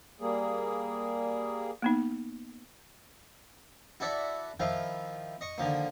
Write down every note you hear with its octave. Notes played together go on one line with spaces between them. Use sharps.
G3 A#3 G#4
A#3 B3 D#4
E4 F#4 A4 D5 E5 F#5
D#3 F3 E4 F4
D#5 C#6
D3 D#3 F3 A#3